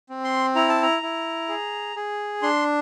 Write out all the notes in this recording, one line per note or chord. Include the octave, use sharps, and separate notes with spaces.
C4
C6
E4 A#5
A5
A#5
E4
G#4
G#4
D4 C6